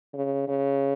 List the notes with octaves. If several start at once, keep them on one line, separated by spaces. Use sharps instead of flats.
C#3
C#3